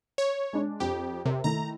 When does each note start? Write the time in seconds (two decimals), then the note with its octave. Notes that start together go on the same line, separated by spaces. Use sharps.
0.18 C#5
0.53 G#3 D4
0.80 F2 G4
1.25 C3 A#4 E5
1.44 D#3 A3 E4 A#5